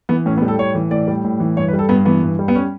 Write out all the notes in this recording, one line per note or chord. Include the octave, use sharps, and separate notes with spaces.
E3 B3
A2 C#4
B3
G3
A4
A2 C#5
E3
A2 D5
G3
A2
E3
G2 C#5
B4
G3
A4
G2 B3
E3 B3
G2
G3
B3
C#4